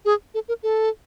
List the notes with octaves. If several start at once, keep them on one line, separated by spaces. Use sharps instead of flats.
G#4
A4
A#4
A4